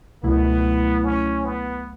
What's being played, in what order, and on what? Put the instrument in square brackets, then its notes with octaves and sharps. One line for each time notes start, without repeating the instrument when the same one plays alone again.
[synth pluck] C#2 B2 F#3 A3 E4 [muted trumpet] B3
[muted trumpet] C#4
B3